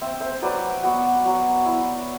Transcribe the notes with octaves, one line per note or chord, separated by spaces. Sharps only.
C4 E5
C5 E5
F#3 B4 D5
B3 F#4
F#3
E4